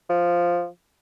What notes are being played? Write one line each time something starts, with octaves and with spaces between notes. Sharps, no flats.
F3